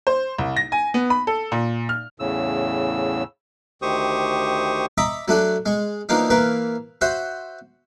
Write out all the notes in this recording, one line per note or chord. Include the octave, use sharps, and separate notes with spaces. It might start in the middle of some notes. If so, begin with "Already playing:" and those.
C5
C2
A#6
G#5
B3
B5
A4
A#2
F6
E2 A2 C#3 E6
D2 D#3 G4 C5 C#6 D#6
D#5 E5 A#5 B5 C#6 D6
F#3 A3 D4 F#4
G#3 C#6
E3 F3 A#3 D4 D#4
E3 A#3 A#4 B4
F#4 C5 E5 F#5